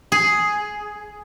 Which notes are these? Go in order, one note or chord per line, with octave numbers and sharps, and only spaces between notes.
G#4